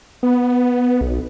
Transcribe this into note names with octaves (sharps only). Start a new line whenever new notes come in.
B3
B1